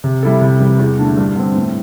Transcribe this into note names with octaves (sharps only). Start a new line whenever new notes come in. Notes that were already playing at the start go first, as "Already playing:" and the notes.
C3
G3 E4 A4
C3
E3 G3
E2
D3 A3 D4
G2
D3 C4
A2